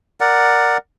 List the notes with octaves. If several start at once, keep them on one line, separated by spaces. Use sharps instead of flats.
A#4 D5 F#5